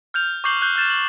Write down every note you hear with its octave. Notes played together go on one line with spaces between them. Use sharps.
F6 G6 F7
C#6 D6 G6 C7 F#7 G7
F#6 G6 F7 G7
F6 G6 A6 E7
F#7